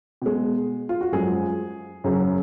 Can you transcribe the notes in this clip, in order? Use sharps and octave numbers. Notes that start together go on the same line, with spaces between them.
B2 G#3
F4
F#4
F#2 F3 G#3 G#4
F#2 C#3 F#3